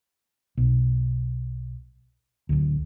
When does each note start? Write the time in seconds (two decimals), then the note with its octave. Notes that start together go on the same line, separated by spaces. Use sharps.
0.57 B1
2.49 D1 D2